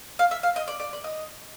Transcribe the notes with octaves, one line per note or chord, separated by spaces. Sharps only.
F5
E5
F5
D#5
D5
D5
D5
D#5